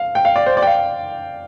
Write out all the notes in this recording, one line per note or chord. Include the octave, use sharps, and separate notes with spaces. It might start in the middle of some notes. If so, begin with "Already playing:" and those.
Already playing: F5
G5
F5
D5
C5
D5
G5
F5